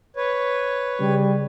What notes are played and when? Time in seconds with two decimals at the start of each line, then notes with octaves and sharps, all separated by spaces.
0.16 B4 C#5
1.00 C#3 G3